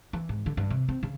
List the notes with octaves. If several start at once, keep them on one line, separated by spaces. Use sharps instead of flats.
E3
G#2
D3
G2
C3
C4
C#3